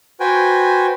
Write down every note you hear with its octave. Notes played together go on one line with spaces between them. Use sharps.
F#4 B4 C5 G5 G#5